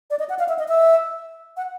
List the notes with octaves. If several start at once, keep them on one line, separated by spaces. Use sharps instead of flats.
D5
D#5
F#5
F5
E5
D#5
E5
F#5